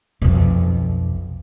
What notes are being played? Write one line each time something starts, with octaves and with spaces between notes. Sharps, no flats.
B1 F2